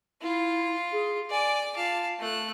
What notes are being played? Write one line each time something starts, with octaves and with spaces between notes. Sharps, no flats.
E4 F4
G#4
D5 G#5 D6
F4 F5 A5
A3 F#6